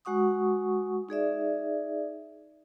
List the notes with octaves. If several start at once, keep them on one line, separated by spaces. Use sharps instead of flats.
G#3 F#4 F#5 C#6 D#6
D#4 G#4 D5 E5